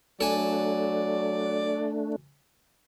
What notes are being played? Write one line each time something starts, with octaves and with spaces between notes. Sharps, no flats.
F#3 A3 D4 A4 D5 G#5